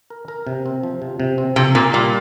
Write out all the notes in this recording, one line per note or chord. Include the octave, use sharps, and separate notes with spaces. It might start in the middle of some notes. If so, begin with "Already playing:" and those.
A#4
A#4
C3
C4
F3
C3
C3
C4
C3 F3
A#2 A#4
A#2 G3